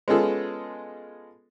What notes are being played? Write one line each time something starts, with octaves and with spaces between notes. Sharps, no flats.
G#3 B3 C#4 F4 G#4 A4